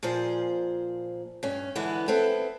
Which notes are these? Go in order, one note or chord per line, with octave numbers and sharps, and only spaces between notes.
A#2 F3 G#4 C5
G2 C#4
D3 E3 G#3 B3 E4
B3 C4 E4 A4